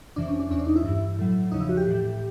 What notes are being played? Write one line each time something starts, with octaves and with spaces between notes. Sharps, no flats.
F2 C3 E3 D4
C#4
D4
E2 C3 E3 C#4
D4
D#4
E4
G2 E3
A2 F#3
E2 C#3 F3 D#4
E4
F#4
G4
A2 E3